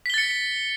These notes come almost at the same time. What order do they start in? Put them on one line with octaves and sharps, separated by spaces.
B6 G7 A6 C#7